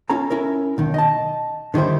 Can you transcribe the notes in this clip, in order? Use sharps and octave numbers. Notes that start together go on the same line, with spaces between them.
C#4 F4 A4 A#5
C#4 E4 A#4
B1 D#3
D#5 A5
D3 D#3 G3 E4 C5